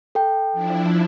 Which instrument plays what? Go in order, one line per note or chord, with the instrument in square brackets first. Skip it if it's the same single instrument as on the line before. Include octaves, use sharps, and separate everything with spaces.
[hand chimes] A4 G5
[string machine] F3 D4 E4